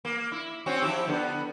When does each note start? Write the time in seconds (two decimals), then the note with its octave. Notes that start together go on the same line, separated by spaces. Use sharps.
0.05 A#3
0.32 E4
0.66 C4 C#4 F#4
0.82 F3 E4 G4
1.08 D3 B3